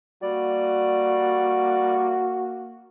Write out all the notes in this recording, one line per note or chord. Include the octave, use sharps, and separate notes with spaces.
G3 A#3 F#4 D5